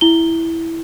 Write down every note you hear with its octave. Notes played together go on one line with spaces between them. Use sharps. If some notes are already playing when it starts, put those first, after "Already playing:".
E4 G7